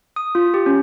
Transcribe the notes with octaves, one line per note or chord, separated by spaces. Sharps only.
D#6
F4
G4
C#4